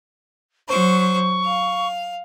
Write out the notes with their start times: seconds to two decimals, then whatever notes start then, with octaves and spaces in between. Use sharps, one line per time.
0.69 F#3 C5 C#6
1.44 F5